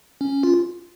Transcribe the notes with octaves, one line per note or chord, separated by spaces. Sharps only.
C#4
F4